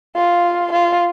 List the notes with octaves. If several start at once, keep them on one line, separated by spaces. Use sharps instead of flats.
F4
F4